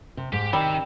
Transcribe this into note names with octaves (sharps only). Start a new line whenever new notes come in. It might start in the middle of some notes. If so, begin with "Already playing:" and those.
C3
G#2 G4
D#3 G3 C4 E5